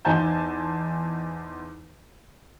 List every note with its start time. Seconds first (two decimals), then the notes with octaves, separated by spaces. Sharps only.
0.05 E2 D#4 C5 G#5 A5 G6